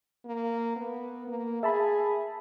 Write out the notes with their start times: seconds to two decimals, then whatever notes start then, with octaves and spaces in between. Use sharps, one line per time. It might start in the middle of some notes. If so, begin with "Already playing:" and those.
0.26 A#3
0.76 B3
1.27 A#3
1.63 G#4 E5 A5 B5